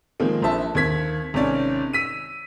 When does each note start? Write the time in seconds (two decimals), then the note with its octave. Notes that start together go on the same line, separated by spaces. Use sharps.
0.20 D#3 F3 G#3 A#3 C4
0.42 A#1 C5 E5 A5
0.75 D#2 C4 G#6 B6
1.34 G#1 C3 C#4 D5
1.93 E6 B6 D#7